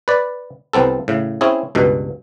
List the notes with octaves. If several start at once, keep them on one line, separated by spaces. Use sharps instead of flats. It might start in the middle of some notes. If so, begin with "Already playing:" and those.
B4 D5
C2 B3 C4 A4
A2 C#3
C4 C#4 E4 G#4
C#2 G2 B2